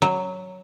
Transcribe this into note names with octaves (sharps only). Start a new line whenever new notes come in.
F#3